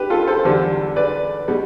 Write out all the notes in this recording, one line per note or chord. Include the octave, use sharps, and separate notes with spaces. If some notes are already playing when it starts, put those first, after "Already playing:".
Already playing: G4 B4
F4 A4
A4 C5
E2 D3 G3
B4 D5
B2 G3